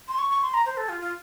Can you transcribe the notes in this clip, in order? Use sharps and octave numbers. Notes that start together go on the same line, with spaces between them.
C6
C#6
C#6
C6
A#5
C5
A4
F4
F4